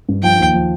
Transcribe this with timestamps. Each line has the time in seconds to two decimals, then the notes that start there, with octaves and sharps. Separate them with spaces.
0.08 G2
0.23 F3 G5
0.39 D#2
0.54 F3